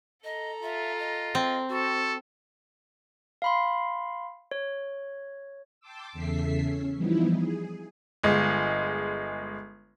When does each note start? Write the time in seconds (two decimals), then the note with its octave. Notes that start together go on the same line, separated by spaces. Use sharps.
0.24 A4 D#5 A#5
0.63 F4 E5
0.99 D#5
1.35 C4
1.69 F#4 A4
3.42 F5 B5 C6
4.51 C#5
5.80 G5 A5 C6 D6 E6
6.13 E2 C#3 A4 E5 B6 C7
6.61 C#4
6.94 E3 F3 G3 B3 D#4 E4
7.30 G#4
8.23 G1 G#3